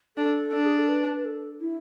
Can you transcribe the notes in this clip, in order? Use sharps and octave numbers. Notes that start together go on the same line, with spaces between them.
D4 A4
D4
G#4
A4
B4
B4
A4
E4